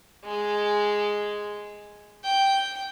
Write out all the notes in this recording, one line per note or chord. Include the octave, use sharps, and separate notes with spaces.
G#3
G5